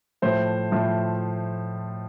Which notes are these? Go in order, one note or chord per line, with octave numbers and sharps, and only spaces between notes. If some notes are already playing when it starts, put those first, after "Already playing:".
A2 F3 A3 C5
A2 F3 A3